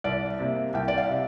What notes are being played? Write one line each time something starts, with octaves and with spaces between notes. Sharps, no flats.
C2 D5
C3 A#3
C2 G5
D5
F5
C3